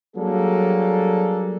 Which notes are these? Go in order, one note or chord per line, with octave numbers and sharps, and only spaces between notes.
F#3 G3 A#3 D4 G#4 A4